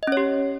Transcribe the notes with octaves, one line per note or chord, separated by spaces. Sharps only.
C#4 G4 C#5 D#5